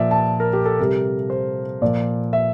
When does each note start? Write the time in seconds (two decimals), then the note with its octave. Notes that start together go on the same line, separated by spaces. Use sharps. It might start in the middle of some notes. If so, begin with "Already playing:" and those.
Already playing: A#2 F3 D5 E5
0.11 A5
0.40 A#4
0.53 G4
0.66 A4
0.79 C3 G3 A#4
1.30 C5
1.82 A#2 F3 D5
2.33 E5